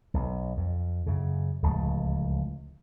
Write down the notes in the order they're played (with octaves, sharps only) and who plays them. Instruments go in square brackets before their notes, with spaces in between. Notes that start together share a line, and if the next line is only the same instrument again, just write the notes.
[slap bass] B1
F2
F#2 C#3
D1 C#2 F3 A3